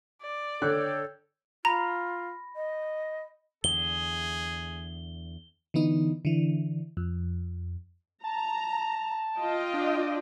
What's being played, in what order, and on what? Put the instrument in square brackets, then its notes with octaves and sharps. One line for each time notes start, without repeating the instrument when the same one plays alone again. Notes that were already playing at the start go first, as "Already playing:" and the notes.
[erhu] D5
[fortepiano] D3 F#6 [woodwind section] A4 C#5 G5
[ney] F4 [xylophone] A#5 [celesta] B5 A#6
[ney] D#5
[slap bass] E2 D3 [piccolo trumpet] G#4 [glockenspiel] G7
[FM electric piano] D3 E3 B3 D#4
D3 E3
F2
[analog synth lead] A5 [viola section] A#5
[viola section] F4 D#5 G5
[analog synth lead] D4